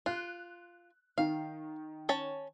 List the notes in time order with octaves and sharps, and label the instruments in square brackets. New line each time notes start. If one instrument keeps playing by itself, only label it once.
[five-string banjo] F4 [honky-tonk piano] F#6
[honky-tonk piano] D#3 [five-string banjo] F5
[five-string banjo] C#4 C#5 A5